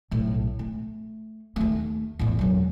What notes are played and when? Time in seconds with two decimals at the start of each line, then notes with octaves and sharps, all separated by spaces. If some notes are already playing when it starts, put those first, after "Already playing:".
0.11 B1 A2
0.59 A3
1.56 D#2 A3
2.19 E2 A2
2.39 E1 F#3